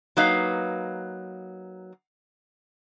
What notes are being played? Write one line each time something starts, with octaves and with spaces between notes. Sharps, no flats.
F#3 A#3 D#4 B4 F5